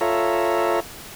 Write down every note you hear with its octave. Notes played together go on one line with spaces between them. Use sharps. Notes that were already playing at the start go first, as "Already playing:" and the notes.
F4 A4 C#5 E5 A#5